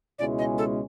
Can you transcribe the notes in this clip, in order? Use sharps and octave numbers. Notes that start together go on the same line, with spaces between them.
C#2 B2 G#3 C#4 E4 D5
D#5
A4